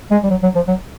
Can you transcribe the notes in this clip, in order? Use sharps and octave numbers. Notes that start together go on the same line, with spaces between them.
G#3
G3
F#3
F#3
F3
F#3